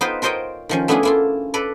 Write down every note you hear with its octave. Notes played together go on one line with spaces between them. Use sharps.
B3 D#4 F4 B4 C5 G5
F4 A#4 C5 C#5 D#5 G5
D#3 F3 C#4
A3 B3 C#4 D4 E4 G#4
A#3 E4 F4
A4 B4 D5